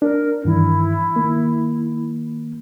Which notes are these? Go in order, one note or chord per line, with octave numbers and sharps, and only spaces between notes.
D4 A#4
G2 D#3 E3 E4
D#3 A#3